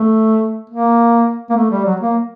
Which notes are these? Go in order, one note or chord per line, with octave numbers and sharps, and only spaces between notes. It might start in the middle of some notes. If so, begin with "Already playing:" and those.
Already playing: A3
A#3
A#3
A3
G3
F#3
A#3